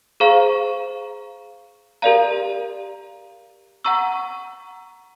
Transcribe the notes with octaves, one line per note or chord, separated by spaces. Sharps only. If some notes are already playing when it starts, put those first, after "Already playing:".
G#4 C5 F5 A#5 C#6
G4 A#4 D5 F5 A#5
F#5 A#5 C#6 E6